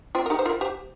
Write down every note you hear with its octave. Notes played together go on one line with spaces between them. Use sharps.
C4 F4
A#4
D#4 G4
C5
F4 A#4
G4 C5